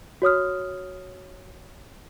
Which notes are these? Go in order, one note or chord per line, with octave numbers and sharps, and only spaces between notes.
F#4 C#5 D#6 F6